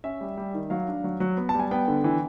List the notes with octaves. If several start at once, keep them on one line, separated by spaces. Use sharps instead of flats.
C#4 E5
G3
G3
D#3
F#3 F5
D4
F#3
F#3
B3
A5
G3
G#5
B3 G5
D3
E3